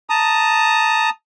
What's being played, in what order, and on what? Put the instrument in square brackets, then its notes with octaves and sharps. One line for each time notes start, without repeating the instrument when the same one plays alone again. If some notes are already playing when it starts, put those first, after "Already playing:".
[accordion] A5 A#5 D#6